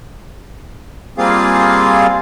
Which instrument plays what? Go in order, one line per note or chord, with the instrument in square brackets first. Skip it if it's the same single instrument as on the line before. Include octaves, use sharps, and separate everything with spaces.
[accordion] G3 A#3 C4 F4 G#4 F5